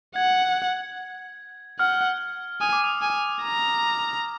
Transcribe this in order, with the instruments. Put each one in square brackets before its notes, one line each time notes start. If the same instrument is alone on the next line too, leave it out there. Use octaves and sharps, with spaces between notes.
[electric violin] F#5 [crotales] G#6
[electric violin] F#5 [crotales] F6
[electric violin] G#5 [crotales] D#6
[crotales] D6
D#6
[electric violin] G#5
A#5